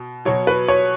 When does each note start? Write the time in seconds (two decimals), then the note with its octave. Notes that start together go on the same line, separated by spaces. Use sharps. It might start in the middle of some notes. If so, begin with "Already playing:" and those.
Already playing: B2
0.25 B2 F#3 C#5
0.47 B4
0.68 C#5